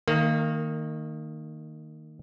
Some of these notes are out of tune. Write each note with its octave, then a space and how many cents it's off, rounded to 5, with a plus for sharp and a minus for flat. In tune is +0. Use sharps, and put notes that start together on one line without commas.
D#3 +0 A#3 -25